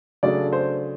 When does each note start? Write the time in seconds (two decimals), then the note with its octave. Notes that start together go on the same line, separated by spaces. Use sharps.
0.23 C#3 F#3 A3 D4 D5
0.53 C5